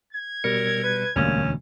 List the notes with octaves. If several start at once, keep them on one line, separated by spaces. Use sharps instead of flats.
G#6
B2 G3 A#4 C#7
B4
E1 D2 G3 A#3 C#4